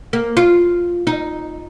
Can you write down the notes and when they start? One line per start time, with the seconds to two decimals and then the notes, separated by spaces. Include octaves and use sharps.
0.13 A#3
0.37 F4
1.07 D#4